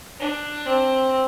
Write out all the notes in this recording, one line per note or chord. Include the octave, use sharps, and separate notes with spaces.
D4
C4